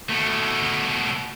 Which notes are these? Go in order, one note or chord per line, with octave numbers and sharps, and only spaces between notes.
B2 A3